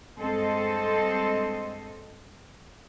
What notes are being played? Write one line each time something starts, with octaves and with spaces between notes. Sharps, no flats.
G2 G#3 C4 A4 C5 D#5